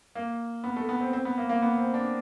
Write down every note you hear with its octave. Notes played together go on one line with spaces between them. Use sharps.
A#3
B3
A3
B3
C4
C4
B3
A#3
A#3
B3
C4
D4